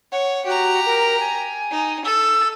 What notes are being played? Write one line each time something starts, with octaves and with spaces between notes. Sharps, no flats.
C#5 F#5
F#4 G4 A#5
A#4
G#5
D#4
A4 E6